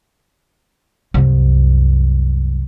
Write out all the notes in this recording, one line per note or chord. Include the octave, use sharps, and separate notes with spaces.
C2 F#2